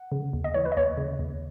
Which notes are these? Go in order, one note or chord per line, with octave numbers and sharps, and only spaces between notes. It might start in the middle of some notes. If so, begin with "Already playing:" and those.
Already playing: F#5
C#3
D#2
D#5
E3 C#5
B4
D#5
D#2 C#5
C#3
D#2